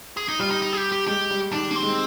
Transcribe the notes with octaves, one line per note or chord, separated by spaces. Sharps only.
G#4
D#4
G3 F4
D#4
D#4
G#4
G4
G4
G#3 G4
G3
D#3 D4
A#3
C4
G#3